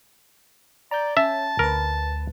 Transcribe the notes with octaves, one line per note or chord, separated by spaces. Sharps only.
D5 A#5 G6
C#4 E5 A5
D2 A#4 B4